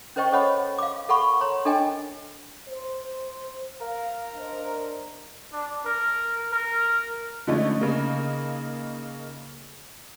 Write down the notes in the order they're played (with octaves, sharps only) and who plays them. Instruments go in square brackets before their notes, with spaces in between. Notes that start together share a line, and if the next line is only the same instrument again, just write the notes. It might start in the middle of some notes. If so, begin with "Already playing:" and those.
[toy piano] C#4 A#4 C5 D#5 G5 C#6
A4 C5 C#5 D#5 F#5 B5
F5 D6
A4 A#4 F#5 B5 C#6
C#5 A#5 C6
D4 A4 A#4 D#5 G5 G#5
[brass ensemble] C5
[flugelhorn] A#4 [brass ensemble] F5
[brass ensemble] D4 C5 D#5
[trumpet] D4
A#4
A#4
[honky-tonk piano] D3 F3 G#3 A3 C#4 D#4
C#3 A#3 D#4